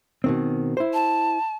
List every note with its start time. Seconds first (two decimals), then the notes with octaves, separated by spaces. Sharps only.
0.24 B2 D#3 C4
0.77 E4 C5
0.94 A5